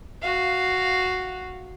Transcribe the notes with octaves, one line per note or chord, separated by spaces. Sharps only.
F#4 F5